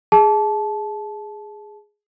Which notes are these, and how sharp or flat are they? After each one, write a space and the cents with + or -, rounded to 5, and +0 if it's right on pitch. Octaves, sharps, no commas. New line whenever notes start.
G#4 +0 A5 -20